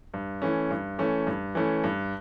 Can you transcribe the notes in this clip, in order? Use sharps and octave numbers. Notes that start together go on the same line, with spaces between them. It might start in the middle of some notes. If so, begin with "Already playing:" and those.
G2
E3 A3 C#4
G2
E3 A3 C#4
G2
E3 A3 C#4
G2